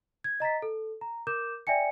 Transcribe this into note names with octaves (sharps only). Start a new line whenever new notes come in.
G#6
D#5 A#5 A6 B6
A4
A#5
A#4 D6 G6 E7
D5 E5 G5 G#5 C#7